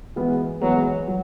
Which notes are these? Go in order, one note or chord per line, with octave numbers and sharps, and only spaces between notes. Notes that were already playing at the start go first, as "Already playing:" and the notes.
E3 G#3 B3 F#4 B4
E3 F#3 G#3 B3 F#4 B4
F#3